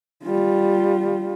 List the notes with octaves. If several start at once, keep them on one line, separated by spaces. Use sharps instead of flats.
G3 F4